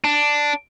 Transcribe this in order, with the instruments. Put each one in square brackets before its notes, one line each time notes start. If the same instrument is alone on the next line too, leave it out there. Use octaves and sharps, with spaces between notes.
[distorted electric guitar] D4